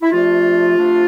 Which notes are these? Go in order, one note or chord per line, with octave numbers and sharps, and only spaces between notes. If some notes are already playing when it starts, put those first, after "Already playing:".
E4
C3 F3 A3 D4 F4
C3 F3 A3 D4